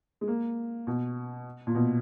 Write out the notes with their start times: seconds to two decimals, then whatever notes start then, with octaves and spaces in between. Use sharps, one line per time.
0.21 G#3
0.28 A#3
0.87 B2
1.67 A#2
1.75 B2